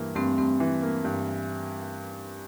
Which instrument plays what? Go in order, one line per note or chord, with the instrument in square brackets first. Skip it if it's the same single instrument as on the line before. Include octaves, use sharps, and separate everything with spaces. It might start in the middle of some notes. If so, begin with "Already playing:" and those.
Already playing: [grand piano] G2 E3 A#3
[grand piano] G2 [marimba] A3 C4
[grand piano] G2 [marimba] A3 C4
[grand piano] E3
A#3
G2